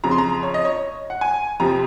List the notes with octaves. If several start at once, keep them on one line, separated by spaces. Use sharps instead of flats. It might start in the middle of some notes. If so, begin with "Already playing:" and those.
F2 C#3 F3 A#5
C6
A#5
C#5
D#5
C#5
F#5
G#5
F2 C3 F3 A#5